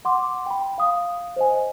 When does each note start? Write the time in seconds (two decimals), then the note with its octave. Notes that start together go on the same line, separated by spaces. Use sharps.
0.05 F#5 C6 D6
0.46 G5 B5
0.78 F5 D#6
1.36 C5 D#5 G#5